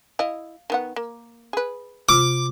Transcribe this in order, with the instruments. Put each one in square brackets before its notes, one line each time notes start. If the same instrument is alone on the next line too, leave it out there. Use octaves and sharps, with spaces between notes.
[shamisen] E4 D#5 [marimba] F5
[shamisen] D#3 B3 F#5
A#3
G#4 B4
[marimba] C3 F4 [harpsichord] D6